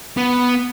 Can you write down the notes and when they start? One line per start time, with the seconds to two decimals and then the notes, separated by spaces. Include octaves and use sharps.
0.17 B3